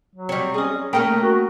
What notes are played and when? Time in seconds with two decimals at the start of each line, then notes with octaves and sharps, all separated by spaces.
0.15 F#3
0.29 G3 C4 C#5
0.54 C#4 G#4 D#5
0.93 A3 A#3 C#4 G#4 A#4 G5 A#5
1.22 F#4